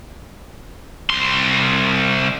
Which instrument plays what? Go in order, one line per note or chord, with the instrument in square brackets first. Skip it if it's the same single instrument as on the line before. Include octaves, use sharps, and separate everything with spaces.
[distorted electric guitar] C2 C6